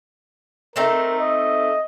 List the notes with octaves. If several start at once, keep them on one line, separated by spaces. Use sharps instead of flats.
A3 C4 D#4 A#4
D#5